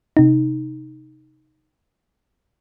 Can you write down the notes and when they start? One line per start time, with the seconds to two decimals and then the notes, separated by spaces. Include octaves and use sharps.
0.17 C3 D#4